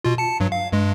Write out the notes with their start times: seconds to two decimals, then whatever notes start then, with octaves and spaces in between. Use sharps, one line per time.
0.04 B2 F4
0.18 A5 C#7
0.40 G2 F#3
0.52 F5
0.72 G2 G#3